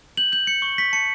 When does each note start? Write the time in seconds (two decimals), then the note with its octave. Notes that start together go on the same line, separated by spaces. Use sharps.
0.17 G6 F#7
0.32 G6 F#7
0.47 G6 C#7
0.62 C#6
0.78 C#6 B6
0.93 A5 C#7